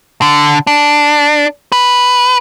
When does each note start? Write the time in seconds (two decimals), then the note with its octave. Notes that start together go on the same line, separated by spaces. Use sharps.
0.22 D3
0.67 D4
1.72 B4